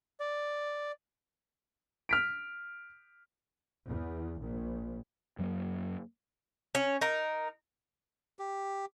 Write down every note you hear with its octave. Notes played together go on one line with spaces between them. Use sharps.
D5
F6 B6 D7
E2
A#1
F#2 F#3 G#3 A#3
C#4
D#4 A#4
G4